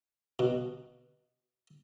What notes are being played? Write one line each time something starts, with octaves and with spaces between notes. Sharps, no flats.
B2